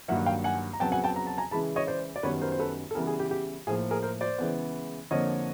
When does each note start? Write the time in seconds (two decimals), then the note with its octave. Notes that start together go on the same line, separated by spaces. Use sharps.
0.08 G2 D#3 F#3 A#3 E5 F#5
0.26 F5 G5
0.44 F#5 G#5
0.73 A#5
0.80 F2 C#3 F#3 B3 G5 A5
0.92 F#5 G#5
1.04 G5 A5
1.16 A#5
1.27 A5
1.38 G#5 A#5
1.51 C#3 E3 G#3 A5 B5
1.76 C#5 D#5
1.87 C5 D5
2.16 D5
2.23 F#2 D#3 G3 B3 B4 C#5
2.42 A#4 C5
2.52 C5
2.60 A4 B4
2.91 A4
2.95 C#3 E3 G3 B3 G#4 A#4
3.07 G#4
3.20 G4
3.31 G4
3.67 A2 F3 A#3 G#4
3.91 G#4 A#4
4.03 A#4 C5
4.21 C5 D5
4.38 C#3 E3 G#3 B3
5.10 F2 D3 F3 A#3 C#5 D#5